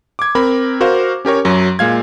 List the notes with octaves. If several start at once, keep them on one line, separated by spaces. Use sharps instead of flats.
D6 G#6
C4 A#4 B5
F#4 A#4 C5 F5
C#4 G4 A#4 C#5
F#2 F#3
A#2 G#3 F5 G#6